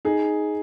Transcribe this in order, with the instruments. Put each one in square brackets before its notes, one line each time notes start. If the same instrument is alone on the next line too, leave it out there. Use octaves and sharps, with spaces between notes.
[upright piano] D#4 G#4